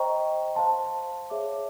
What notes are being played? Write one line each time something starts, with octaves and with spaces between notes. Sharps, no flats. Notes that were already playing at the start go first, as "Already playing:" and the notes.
Already playing: C5 D#5 G5 A#5 C#6
C5 F5 A5 C6
G#4 C#5 E5 A5 D6